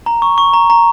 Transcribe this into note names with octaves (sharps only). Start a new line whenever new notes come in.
A#5
C#6
C#6
A#5
A#5